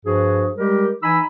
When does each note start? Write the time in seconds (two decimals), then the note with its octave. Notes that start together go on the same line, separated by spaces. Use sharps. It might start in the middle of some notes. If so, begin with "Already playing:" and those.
0.06 G2 F3 F#4 G#4
0.58 G3 G#3 G4 A#4
1.03 E3 D#4 G#5 B5 E6